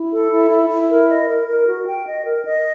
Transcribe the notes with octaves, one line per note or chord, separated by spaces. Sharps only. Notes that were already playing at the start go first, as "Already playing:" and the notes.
Already playing: E4
A4
E4
E4
E4
A#4
D#5
A#4
A#4
F#4
G5
D#5
A#4
D#5